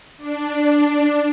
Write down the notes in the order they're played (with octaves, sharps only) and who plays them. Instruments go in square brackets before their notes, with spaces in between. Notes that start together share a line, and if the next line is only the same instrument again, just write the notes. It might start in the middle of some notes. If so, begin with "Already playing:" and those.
[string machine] D4